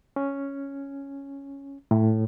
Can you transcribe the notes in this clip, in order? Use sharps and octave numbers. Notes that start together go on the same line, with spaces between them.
C#4
A2